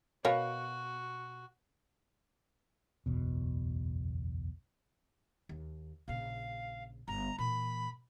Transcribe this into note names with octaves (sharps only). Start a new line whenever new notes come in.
B2 F#4 A#4 C#5 F5
F#1 B1 E2 B2
D#2
A#1 C#3 F5
G1 A#5
A#2 E3 B5